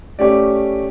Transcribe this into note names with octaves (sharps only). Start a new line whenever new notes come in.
A3 C#4 G4 D5